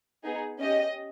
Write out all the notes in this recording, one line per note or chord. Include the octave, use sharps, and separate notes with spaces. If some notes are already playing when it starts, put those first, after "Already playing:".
B3 D#4 G#4
C#4 G4 D#5